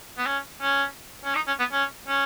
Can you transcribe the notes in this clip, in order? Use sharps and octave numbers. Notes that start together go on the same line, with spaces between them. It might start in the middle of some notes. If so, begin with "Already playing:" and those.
B3
C#4
C#4
C#4
D#4
C#4
B3
C#4
C#4